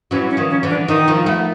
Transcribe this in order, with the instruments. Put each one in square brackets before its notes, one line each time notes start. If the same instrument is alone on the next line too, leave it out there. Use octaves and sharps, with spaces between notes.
[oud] E3 F#3 [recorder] C#4
[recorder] C#4
[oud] D#3 F3
[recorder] C#4
[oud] D3 E3
[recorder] D4
[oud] D#3 [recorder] D#4
[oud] D#3 F3
A3 B3